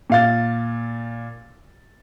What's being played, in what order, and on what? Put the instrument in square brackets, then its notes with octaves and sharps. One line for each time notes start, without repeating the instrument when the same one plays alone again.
[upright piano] A#2 F5 A6